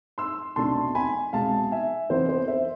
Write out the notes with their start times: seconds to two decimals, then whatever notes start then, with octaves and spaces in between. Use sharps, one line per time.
0.18 C6 E6
0.56 C2 B2 A3 D4 A5 C6
0.95 G#5 B5
1.33 C2 B2 G#3 F5 A5
1.72 E5 G#5
2.09 C3 E3 B3 E4 C5
2.29 C5
2.48 C5 E5